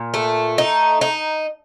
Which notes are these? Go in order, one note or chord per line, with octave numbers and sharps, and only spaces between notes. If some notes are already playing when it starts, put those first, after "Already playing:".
Already playing: A#2
A3
D#4
D#4